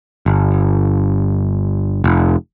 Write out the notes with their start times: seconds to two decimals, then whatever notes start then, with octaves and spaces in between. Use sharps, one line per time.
0.26 G1
2.04 F1